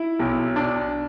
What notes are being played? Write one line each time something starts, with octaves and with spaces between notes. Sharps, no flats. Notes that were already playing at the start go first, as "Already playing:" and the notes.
Already playing: E4
B1
D4